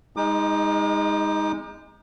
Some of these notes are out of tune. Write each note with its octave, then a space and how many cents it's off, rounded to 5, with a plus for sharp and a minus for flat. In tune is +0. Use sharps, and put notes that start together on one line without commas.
G#3 -20 D#4 +15 D6 +45